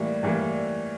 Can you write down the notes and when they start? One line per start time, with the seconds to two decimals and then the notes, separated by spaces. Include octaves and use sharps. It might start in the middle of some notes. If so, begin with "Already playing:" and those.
Already playing: A2 E3 G3 A#3
0.23 A2 E3 G3 A#3